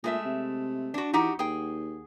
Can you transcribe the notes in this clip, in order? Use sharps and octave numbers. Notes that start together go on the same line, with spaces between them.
A#2 G#3 A3 E5
C3
D4 F#4
E3 D#4 F#4 G4
D#2 G#4 G5